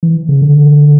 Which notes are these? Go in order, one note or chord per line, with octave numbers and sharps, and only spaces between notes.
E3
C#3
D3